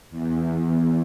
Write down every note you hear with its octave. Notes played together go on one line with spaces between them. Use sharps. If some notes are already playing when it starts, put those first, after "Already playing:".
E2